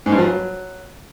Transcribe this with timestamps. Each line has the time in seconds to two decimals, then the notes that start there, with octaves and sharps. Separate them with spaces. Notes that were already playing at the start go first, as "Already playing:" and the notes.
0.06 G#2
0.12 G2
0.18 F3
0.24 F#3